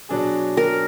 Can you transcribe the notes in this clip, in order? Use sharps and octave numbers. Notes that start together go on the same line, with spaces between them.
B2 F#3 D4 G#4
A#4